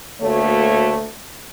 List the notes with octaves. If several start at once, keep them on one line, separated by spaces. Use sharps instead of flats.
D2 A3 A#3 F#4 C#5